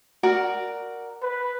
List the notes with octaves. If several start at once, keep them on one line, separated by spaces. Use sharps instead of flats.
F#4 A#4 D5
B4